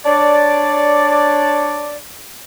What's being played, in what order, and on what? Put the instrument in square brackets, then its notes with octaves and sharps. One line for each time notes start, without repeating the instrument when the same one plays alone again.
[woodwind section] D4 C#5 D5